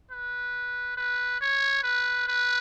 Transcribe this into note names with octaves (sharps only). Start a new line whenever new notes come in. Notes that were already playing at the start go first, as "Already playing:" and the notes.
B4
B4
C#5
B4
B4